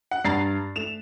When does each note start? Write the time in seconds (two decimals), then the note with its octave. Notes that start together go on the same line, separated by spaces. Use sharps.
0.11 F#5
0.25 G2 A#5 A6 C7
0.76 A3 E7 F7